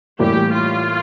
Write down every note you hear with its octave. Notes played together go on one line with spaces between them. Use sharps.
A2 E3 G3 A#3 E4 G4
F4